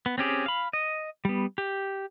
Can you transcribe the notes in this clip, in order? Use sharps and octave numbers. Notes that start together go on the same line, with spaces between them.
B3
C4 C#4 G4 G#4
F5 B5
D#5
G3 B3
G4